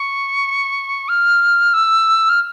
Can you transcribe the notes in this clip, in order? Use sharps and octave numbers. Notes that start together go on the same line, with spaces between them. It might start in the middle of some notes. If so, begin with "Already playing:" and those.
Already playing: C#6
F6
E6
F6